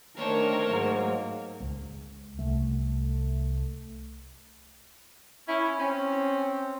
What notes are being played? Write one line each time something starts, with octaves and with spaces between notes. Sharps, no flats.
D#3 A3 D4 A#4 C5 C#5
G#2 F#3 A#3
C#2 G#3
C2 A3
C#4 E4
C4 C#4